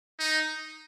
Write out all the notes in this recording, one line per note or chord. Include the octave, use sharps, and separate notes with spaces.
D#4